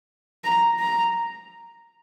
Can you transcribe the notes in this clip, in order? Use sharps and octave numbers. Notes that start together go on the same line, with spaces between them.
A#5
A#5